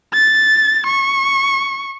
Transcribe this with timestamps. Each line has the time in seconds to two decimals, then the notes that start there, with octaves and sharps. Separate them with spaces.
0.14 A6
0.87 C#6